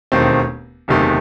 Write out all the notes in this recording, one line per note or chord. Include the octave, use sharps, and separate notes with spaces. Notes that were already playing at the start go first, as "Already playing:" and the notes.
E1 D#2 D#3 A3 C4
F#1 E2 C3 D#3 A3